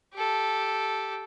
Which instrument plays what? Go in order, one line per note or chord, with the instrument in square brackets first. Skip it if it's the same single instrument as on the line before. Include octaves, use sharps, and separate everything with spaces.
[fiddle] G4 A4